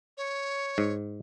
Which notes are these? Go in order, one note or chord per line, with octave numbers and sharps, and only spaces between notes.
C#5
G#2